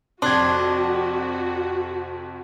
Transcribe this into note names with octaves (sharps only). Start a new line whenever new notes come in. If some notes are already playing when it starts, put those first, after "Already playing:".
F2 C3 D4 F#4 C6 F#6 G#6